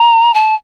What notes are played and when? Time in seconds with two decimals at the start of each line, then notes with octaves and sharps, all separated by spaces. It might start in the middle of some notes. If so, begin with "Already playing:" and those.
Already playing: A#5
0.34 A5